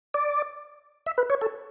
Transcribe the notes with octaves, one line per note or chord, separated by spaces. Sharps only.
D5
E5
B4
C#5
A4